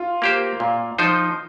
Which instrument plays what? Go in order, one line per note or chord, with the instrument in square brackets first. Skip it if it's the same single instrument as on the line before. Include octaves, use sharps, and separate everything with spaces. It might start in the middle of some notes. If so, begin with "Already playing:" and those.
Already playing: [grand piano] F4
[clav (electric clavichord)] A#3 G4 C5
A#2
F3 D#4 C5